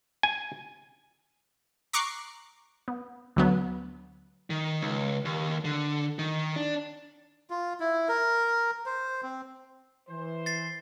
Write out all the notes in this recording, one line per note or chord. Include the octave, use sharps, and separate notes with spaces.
G#5
A#5 C#6 D6 F#6 C7
B3
D2 F#3 B3
D#3
C#2
D#2
D3
D#3
D4
F4
E4
A#4
C5
C4
E3 C5
A6 C7